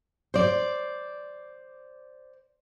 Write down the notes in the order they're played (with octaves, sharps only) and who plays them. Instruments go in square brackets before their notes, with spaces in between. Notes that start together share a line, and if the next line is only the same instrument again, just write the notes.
[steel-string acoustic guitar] C5 D5